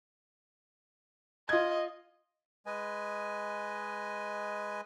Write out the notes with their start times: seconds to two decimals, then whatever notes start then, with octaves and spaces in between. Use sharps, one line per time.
1.49 F4 D#5 G#6
2.66 G#3 B4 D#5 G#5